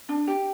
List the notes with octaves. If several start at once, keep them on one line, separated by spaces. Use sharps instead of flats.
D4
G4